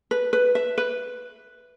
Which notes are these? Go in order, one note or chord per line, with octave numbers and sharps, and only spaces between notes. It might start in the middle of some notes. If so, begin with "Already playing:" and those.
B4
B4
E5
B4